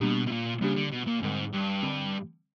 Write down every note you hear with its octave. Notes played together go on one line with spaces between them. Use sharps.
B2 G3 A#3 D4 G4
B2
A#2
C#3 G3 A#3 D4 G4
D3
B2
A#2
G#2 D3 G3 C4
G2
D3 G3 C4